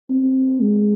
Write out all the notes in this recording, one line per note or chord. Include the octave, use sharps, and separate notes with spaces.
C4
G#3